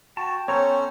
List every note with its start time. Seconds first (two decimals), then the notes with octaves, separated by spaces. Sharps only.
0.17 F#4 G5 A5
0.48 B3 C#4 A4 C5 C#5 A#5